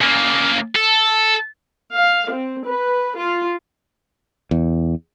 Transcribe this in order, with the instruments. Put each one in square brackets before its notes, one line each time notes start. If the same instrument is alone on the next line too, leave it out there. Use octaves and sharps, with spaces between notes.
[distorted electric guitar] C#3 A#3
A4
[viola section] F5
C4
B4
F4
[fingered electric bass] E2